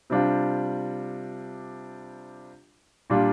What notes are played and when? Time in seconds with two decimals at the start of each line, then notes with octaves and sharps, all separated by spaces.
0.10 C3 G3 D4 F4
3.10 A#2 G3 D4 F4